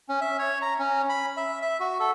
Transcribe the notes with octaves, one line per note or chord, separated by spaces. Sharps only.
C#4
E5
C#5
A#5
C#4
B5
E5
E5
F#4
A4